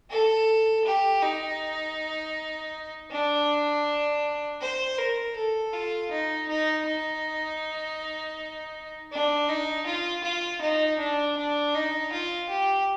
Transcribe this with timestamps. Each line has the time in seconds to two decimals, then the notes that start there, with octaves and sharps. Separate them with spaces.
0.11 A4
0.85 G4
1.22 D#4
3.11 D4
4.61 C5
4.98 A#4
5.37 A4
5.74 F4
6.11 D#4
6.49 D#4
6.86 D#4
9.12 D4
9.49 D#4
9.86 F4
10.24 F4
10.62 D#4
10.99 D4
11.37 D4
11.75 D#4
12.12 F4
12.49 G4